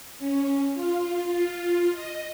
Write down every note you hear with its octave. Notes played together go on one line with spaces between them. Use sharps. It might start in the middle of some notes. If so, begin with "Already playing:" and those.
C#4
F4
F4
D#5